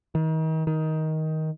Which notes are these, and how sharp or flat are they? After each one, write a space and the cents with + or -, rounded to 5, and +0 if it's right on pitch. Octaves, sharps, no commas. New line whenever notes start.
D#3 +35
D#3 +15